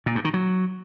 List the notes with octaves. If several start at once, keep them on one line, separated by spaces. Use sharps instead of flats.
A#2
G2
D#3
F#3